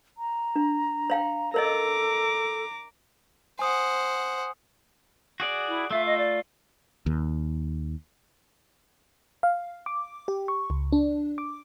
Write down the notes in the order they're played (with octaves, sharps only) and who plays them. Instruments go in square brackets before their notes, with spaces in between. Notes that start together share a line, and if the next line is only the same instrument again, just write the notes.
[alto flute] A#5
[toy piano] D4
C#5 F5 G5
[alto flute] A4 [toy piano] A#4 C#5 D#5 [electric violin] A#5 D6
[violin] C5 F#5 [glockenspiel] G#5 D#6
[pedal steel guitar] F#4 G#4 D5
[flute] E4
[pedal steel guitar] A3 F4 [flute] E5
[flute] D#5
D5
[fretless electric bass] D#2
[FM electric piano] F5
D6
G4
C#6
C#2
D4
D6